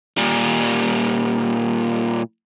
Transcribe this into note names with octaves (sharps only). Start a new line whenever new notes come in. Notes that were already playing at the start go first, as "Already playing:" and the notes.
A#2 G3